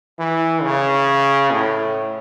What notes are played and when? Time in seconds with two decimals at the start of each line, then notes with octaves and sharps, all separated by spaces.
0.19 E3
0.62 C#3
1.51 A2